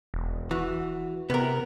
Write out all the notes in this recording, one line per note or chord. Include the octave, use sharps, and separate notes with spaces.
E1
E3 F#4
C3 B3 A#4